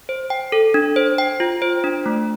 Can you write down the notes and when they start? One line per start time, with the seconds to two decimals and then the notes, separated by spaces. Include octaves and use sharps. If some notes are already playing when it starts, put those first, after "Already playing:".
0.09 C5
0.30 G5
0.52 A4
0.74 D4
0.96 C5
1.18 G5
1.40 F4
1.62 C5
1.84 D4
2.06 A3